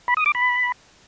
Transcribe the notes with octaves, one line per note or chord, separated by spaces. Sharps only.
B5
D#6
D6
B5